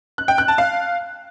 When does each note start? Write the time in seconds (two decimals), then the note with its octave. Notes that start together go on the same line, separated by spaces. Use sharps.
0.18 F#6
0.28 G5
0.38 F#6
0.48 A5
0.58 F5